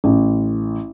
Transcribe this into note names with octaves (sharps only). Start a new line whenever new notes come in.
A1